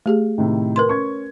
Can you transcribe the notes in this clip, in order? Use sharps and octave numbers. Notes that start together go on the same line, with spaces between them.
A3 G4 G#4
A2 C3 D#3
A#4 B4 C6
C#4 C#6 G#6